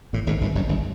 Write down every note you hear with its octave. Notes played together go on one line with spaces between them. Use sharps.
A1 A2
G#1 G#2
G1 G2
F#1 F#2
G1 G2